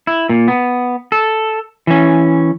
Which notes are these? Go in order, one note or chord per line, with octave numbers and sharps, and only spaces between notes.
E4
A#2
B3
A4
E3 C#4